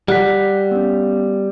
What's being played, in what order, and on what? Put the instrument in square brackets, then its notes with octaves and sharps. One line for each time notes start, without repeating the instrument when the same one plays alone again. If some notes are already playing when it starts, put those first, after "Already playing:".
[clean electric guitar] G3 [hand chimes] F#5 F#6 B6
[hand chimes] B3 C#4